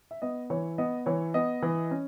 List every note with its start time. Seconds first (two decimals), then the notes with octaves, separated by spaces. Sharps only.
0.11 E5
0.22 B3 D#5
0.50 E3 C#5
0.78 B3 D#5
1.06 E3 C#5
1.34 B3 D#5
1.62 E3
1.91 C#4